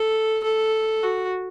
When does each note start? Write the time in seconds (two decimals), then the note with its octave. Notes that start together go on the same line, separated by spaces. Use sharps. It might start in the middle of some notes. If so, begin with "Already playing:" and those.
Already playing: A4
0.44 A4
1.03 F#4